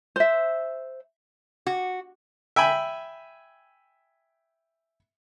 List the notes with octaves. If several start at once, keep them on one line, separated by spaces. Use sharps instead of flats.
C5 E5
F#4
E5 G5 G#5 B5